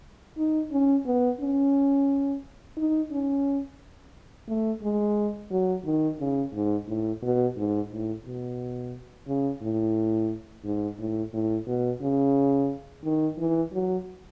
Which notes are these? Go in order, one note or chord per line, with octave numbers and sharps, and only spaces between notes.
D#4
C#4
B3
C#4
D#4
C#4
A3
G#3
F#3
D#3
C#3
G#2
A2
B2
G#2
A2
B2
C#3
A2
G#2
A2
A2
B2
C#3
D#3
E3
F#3